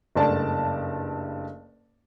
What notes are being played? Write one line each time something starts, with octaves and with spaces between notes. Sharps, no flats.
F#1 G2 A3 D5 A5